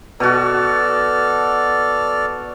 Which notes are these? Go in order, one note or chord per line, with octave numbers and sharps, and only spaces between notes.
B2 F#4 A4 D5 F6